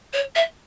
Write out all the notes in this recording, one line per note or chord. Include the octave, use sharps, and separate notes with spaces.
C#5
E5